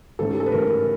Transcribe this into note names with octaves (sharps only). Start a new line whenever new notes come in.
G#2 E3 A3 C#4 A4
G4
A4
B4
G#2 E3 A3 C#4 A#4